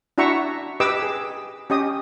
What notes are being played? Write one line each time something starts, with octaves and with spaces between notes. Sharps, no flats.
D4 E4 F#4 E5 A#5 C#6
G4 B4 D#5 D6 E6
G#4
C#4 G4 D#5 D#6